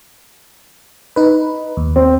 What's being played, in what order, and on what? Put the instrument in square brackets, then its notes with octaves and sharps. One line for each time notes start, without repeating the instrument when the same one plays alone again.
[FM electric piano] D#4 B4
D#2
[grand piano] C4